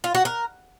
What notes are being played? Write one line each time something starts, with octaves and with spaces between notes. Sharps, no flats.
F4
F#4
A#4